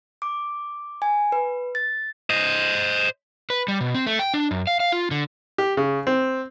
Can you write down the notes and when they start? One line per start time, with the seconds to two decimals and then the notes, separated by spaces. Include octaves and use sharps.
0.22 D6
1.02 G#5
1.32 B4
1.75 A6
2.30 C5 D#5
3.50 B4
3.68 G3
3.80 B2
3.94 C4
4.06 A3
4.19 G5
4.34 D4
4.51 F#2
4.67 F5
4.80 F5
4.92 F4
5.11 D3
5.58 G4
5.77 C#3
6.07 C4